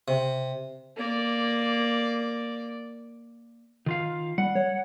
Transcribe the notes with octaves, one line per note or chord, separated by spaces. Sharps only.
C3
A#3 D5
D#3 F4 F5
G3 F#5
C#5